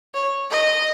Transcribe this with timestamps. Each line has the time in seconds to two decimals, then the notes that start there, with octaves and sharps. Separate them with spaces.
0.14 C#5
0.51 D#5